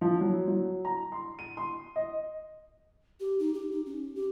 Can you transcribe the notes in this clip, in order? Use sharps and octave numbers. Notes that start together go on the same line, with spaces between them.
F3
F#3
F#3
A#5
C6
D#7
C6
D#5
G4
D#4
G4
D#4
C#4
G4